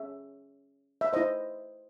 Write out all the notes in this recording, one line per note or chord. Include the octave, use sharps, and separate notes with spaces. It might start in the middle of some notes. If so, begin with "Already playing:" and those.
Already playing: C#4 G#4 C#5 E5
E5
E4 C5 D#5